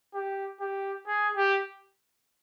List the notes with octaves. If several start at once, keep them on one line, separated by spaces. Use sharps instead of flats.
G4
G4
G#4
G4